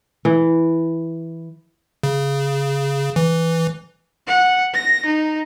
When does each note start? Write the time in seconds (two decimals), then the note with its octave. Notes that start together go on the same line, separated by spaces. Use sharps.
0.25 E3
2.03 C#3
3.16 E3
4.27 F#5
4.74 A#6
5.06 D#4